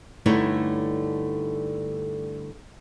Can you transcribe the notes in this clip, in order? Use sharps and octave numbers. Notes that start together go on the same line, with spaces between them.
G2 D3 A3 D#4 E4 C#5